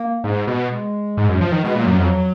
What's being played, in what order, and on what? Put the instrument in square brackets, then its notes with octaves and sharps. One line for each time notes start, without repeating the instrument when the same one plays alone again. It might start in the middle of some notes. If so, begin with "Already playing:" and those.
Already playing: [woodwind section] A#3
[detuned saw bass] G#2
B2
[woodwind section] G#3
[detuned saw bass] G#2
F#2
F3
D#3
[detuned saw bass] B2 [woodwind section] G#3
[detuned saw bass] A#2 [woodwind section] F#3
[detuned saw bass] F#2
[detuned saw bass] F2 [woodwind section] F#3